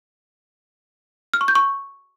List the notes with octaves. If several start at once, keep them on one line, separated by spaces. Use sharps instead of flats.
F6
C#6
G6
C#6